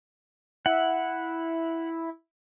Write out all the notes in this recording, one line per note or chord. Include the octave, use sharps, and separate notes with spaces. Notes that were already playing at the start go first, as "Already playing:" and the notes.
E4 F#5